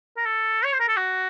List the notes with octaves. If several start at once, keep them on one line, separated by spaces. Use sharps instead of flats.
A#4
A4
C#5
C5
A#4
A4
F#4